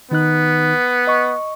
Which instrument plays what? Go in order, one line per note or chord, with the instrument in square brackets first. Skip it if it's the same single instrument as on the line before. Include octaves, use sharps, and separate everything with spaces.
[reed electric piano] D#3 D#4 F#6 [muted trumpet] B3
[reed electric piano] D#5 C#6